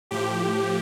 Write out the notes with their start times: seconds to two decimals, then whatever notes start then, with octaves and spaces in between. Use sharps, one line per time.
0.11 A2 F3 G4